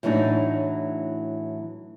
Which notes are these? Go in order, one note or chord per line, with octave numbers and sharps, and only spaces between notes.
A2 E3 F#3 D4 D#4